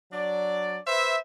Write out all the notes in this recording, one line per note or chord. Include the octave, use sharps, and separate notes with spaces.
F#3 D4 D5
B4 C5 E5